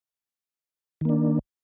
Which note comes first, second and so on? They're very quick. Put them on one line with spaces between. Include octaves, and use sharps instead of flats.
D#3 A#3 D4